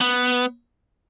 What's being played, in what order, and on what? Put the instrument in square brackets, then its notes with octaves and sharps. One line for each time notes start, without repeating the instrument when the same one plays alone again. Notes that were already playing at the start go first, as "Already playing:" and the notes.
[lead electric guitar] B3